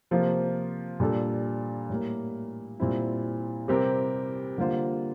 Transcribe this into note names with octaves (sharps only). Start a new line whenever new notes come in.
C3 F3 A#3 F4
A#2 G3 D4 A4
A2 G3 A#3
A#2 G3 C4 E4
C3 G3 C4 G4 A#4
D3 G3 A#3 F4 C5